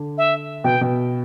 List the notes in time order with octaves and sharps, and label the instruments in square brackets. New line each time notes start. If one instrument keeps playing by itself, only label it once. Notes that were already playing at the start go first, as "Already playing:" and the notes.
Already playing: [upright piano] D3
[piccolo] E5
[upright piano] B2 [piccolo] G5
[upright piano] B2